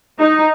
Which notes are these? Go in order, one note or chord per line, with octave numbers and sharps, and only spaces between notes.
D#4